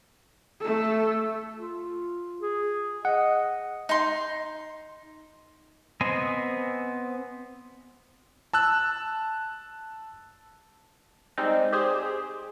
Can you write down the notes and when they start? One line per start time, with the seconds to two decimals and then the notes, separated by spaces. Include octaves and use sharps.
0.60 A3 A4
1.57 F4
2.42 G#4
3.05 D#5 F#5
3.89 D#4 C6
6.01 B3 C4 C5 D#5 G#5
8.53 A5 E6 F#6
11.38 G3 G#3 C4 D#4
11.73 G4 G#4 C5